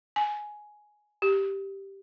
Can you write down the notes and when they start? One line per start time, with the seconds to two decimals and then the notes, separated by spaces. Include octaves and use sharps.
0.16 G#5
1.22 G4